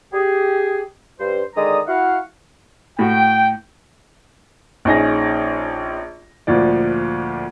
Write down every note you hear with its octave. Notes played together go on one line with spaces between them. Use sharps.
G4 G#4
G2 C5
D3 D#3 G#3 D5 A#5 D#6
E4 F#4 F5 F#5
A2 F#4 G5
A#1 C#4 D#4 G#4 A#6
D2 A#2 F3 D5